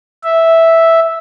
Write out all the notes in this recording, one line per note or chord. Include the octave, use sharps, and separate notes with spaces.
E5